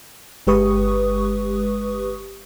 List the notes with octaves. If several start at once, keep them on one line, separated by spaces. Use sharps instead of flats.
G1 G#3 G4 B4 C#6 D#6